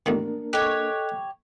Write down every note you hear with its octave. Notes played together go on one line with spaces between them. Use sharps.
A1 E2 D#3 A#3 D4 A#4
G4 A4 C#5 D#5 F#6